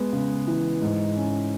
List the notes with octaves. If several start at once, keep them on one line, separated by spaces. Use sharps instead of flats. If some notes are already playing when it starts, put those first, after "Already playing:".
Already playing: G#3 B3
C#3
E3
G#2
C#4